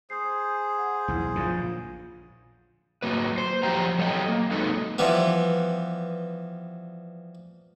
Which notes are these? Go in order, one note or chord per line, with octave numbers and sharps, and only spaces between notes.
G#4 C5 D#6 C7
F#5
B1 E2 E4
A#1 F#2 D3 F4 F5
F#3 A#3 B4
C5
F3 F#3 G4 C5 G5 A#5
F#3 A4 C#5 D#5 G5
A#3
F#3 G#3 D#4 A4 B4
E3 F3 G3 B3